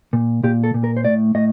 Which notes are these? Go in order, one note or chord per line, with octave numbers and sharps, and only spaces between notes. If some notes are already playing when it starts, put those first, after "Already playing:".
A#2
A#2 G4
A4
A#2
A#4
C5
A2 D5
A2 D#5